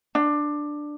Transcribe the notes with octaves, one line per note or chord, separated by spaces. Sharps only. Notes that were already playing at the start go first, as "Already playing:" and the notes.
D4